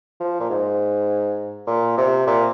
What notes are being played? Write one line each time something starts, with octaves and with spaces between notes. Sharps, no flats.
F3
A#2
G#2
A#2
C3
A#2